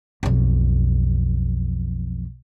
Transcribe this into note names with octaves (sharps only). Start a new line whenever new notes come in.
B1 F2